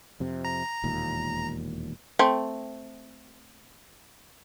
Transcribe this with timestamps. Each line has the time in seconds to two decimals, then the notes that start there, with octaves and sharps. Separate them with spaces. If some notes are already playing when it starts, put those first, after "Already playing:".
0.20 F2 C3
0.45 A#5
0.84 E1 D#2 A#2
2.19 A3 C4